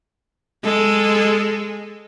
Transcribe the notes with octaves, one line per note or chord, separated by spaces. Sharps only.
G#3 A4